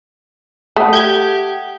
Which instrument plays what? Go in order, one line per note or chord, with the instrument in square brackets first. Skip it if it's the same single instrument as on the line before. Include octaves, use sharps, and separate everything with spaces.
[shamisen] A3 [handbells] F#5 D#6
[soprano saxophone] G4 [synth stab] G6 G#6